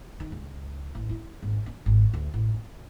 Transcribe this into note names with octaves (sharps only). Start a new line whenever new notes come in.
D#3
C#2
A1
E4
G#1
C#4
G#1
D2
A1
C#4